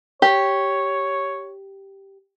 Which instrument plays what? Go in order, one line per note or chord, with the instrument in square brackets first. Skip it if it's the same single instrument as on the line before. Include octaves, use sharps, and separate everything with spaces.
[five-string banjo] G4 [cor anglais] C#5